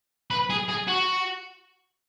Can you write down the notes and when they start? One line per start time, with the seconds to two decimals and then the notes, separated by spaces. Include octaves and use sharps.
0.31 B4
0.50 G#4
0.68 G#4
0.88 F#4